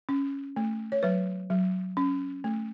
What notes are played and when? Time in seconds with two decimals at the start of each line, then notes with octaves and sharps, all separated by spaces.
0.09 C#4
0.56 A3
0.92 C#5
1.03 F#3 B4
1.50 F#3
1.97 C#4
2.44 A3